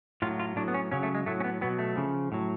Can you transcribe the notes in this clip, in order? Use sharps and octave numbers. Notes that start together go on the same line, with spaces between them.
A2 F#3 F4
F4
A2 F#3 D4
B3
C#4
C#3 F#3 C#4
A3
G#3
A2 F#3 A3
C#4
B3
B2 F#3 B3
A3
C#3 F3
A2 F#3